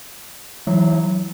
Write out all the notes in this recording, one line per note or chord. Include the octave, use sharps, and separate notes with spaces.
E3 F#3